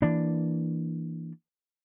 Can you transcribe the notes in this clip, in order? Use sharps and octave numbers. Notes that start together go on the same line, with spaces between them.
E3 A#3 D4